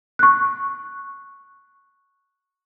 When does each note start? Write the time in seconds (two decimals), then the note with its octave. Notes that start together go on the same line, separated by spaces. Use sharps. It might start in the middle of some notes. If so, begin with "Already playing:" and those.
0.19 C#6 F#6